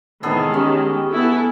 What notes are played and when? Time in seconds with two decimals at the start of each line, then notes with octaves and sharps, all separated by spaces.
0.23 A2 C3 D#3 E3 G#3 B3 G#4 A4
0.54 C#4 G4
1.11 B3 E4 A4